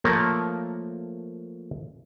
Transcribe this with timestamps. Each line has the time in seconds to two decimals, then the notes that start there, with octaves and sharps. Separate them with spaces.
0.04 F3 A3 A#3 A#4 C#5